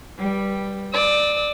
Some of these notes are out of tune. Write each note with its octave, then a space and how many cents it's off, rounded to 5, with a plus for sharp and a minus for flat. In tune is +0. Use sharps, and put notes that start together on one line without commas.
G3 +0 B4 -20 G5 +0
D5 +15 E6 -30